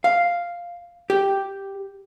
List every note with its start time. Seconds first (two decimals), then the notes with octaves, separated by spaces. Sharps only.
0.04 F5
1.10 G4